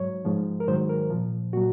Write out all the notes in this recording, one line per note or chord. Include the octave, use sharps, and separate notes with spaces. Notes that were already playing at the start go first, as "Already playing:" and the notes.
Already playing: G#2 F#3 C#5
G#2 F3
A#4
G#2 D#3 F#3 C5
A#4
A#2 F3
A#2 F#3 F#4